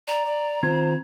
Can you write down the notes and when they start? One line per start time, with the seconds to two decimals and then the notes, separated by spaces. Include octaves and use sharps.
0.08 D5 A#5
0.26 D5
0.63 D#3 C4 F4 C5 G#6